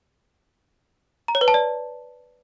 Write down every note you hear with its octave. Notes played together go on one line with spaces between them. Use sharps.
A#5
C#5
B4
A5
D5